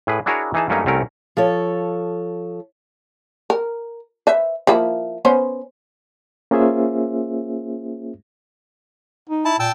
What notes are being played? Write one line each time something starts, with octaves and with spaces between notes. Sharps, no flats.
A2 G#4 B4
D4 E4 F#4 G#4 A#4 C#5
E3 D#4 G#4 A5
G2 F#3 A3 A#3 C#4 D#4
C2 A3 C4 C#4 A#4
F3 A4 C#5
A#4
B4 C5 E5
F3 A#3 E4
B3 C#4 C5
A#3 C#4 F4 G#4 C5 E5
D#4
E4 A5
A#2 G5 A5 E6